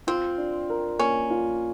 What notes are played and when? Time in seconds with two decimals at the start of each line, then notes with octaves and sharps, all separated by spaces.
0.07 C4 F4
0.38 D4
0.70 A#4
0.99 A#3 C#4
1.30 F4